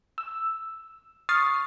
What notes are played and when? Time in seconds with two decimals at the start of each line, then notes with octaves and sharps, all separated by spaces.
0.18 E6
1.29 C#6 D#6 F6 A6 C7